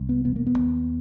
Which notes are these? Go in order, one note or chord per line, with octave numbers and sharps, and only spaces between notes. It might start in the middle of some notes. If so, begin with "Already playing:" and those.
Already playing: C2
B3
E1 B3
A#3
B3
D#2